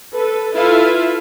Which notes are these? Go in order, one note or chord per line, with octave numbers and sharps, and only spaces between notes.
A4 B4
E4 F4 A4 B4 E5 F5